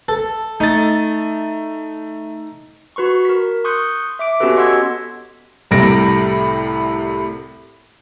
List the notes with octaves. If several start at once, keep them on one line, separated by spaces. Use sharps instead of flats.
A4
A3 D#4 A6
F#4 B4 C6 C#6
A#4 B6
C6 C#6 D#6 F#6 G6 C#7
E5 D6 D7
B3 C#4 F#4 G4 A4 B4
D#5 F#5 C6 E6 G#6 B6
C2 A2 C3 G3 A#6 D7